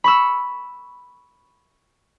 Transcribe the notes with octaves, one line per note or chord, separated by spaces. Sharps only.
B5 C#6 E6